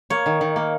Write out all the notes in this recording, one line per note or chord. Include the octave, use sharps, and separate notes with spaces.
A#3 C#5
D#3
D#3
A#3